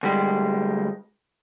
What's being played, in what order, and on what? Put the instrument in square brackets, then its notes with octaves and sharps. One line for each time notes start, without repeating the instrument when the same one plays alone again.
[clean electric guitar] D2 G3 G#3